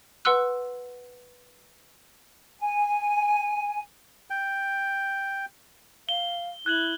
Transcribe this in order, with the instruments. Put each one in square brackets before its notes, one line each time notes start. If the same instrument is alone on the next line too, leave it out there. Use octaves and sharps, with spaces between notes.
[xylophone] B4 F#5 C6 E6 F#6
[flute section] G#5
[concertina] G5
[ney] F5 [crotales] G7
[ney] E4 [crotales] F#6 G#6 F#7